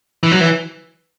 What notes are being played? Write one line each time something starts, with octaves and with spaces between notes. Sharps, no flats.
E3
F#3
E3